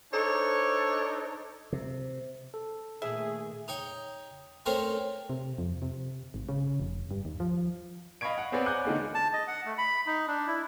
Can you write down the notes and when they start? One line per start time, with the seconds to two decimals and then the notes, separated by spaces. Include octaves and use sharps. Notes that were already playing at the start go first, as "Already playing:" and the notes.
0.13 D4 D#4 A4 C5 C#5
1.73 C3
2.54 A4
3.02 A#2 D#3 A3 G#4 E5
3.68 D#4 C#5 G5
4.66 A3 C4 C#4 A#4 C5 C#5
5.30 C3
5.58 F2
5.82 C3
6.34 G#1
6.49 C#3
6.80 F1
7.11 G2
7.25 D#2
7.40 F3
8.21 D#5 F5 B5 C#6 G#6 D7
8.38 F#5
8.52 B3 C4 G#4 B4 C#5 D5
8.66 F#5 G#5 A#5 D6 F#6 G6
8.85 D3 D#3 G#3 A#3
9.15 A5
9.33 D#5
9.48 F#5
9.66 A3
9.78 B5
10.07 D#4
10.28 D4
10.47 E4